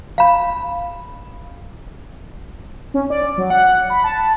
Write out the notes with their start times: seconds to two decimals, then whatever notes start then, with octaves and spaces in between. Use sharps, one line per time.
0.18 F5 B5
2.94 C#4
3.10 D5
3.37 F#3
3.50 F#5
3.90 B5
4.04 A5